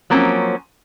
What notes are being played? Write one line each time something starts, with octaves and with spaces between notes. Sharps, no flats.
F3 F#3 A#3 C4 C#4